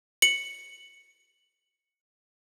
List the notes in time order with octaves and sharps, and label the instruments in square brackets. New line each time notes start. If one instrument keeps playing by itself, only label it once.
[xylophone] C#7 F#7